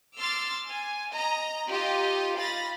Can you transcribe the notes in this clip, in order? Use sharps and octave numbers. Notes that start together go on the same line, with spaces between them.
C6 D6 E6 F6 A6
G#5
D#5 A#5
D#4 F4 G4 D#5
F5 B5 A6 A#6